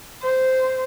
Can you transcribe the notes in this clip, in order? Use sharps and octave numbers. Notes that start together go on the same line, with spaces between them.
C5